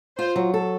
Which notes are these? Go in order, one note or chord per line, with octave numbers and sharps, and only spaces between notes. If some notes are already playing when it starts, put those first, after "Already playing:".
F4 C5
F#3
A4